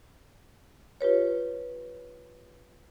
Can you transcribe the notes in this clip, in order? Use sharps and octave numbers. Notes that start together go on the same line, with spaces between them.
F4 G4 B4 C#5